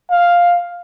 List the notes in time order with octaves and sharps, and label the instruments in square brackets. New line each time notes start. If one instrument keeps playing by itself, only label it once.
[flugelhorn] F5